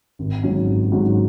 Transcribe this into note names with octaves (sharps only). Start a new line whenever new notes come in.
G#1
G#2 F#3 C#4
G#1
G#2 F#3 C#4